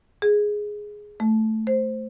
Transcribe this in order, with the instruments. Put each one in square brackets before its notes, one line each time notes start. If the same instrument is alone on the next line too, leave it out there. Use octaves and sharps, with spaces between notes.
[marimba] G#4
A3
C5